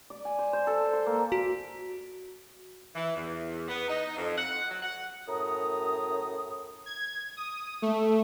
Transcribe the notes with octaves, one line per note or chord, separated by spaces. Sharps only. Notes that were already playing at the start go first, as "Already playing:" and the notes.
D5
G#5
C5
C5
A4
C6
C6
A#3
F#4
E3
E2
B3
D#4
F2
F#5
F#3
F#5
F#2 A2 A#5 D#6
G#6
D#6
A3